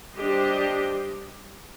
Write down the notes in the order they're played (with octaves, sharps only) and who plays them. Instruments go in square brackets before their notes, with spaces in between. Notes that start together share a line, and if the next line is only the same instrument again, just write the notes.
[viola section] G3 D4 G4 C5 D#5